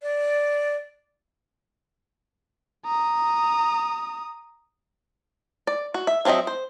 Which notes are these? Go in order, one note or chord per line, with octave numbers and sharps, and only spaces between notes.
D5
A#5 D#6
D5
F#4
E5
F3 F#3 C4 D#5 E5
C5